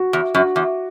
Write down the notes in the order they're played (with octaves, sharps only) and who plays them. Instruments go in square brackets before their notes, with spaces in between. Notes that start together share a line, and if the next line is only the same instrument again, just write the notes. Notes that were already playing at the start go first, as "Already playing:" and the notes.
Already playing: [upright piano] F#4
[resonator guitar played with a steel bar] E2
[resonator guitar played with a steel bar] F#2 [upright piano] F#4
[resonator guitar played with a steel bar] E2